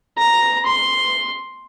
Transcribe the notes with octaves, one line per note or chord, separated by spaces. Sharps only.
A#5
C6